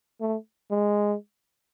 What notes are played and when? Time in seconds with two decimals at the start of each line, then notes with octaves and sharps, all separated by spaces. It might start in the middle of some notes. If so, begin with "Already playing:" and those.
0.21 A3
0.71 G#3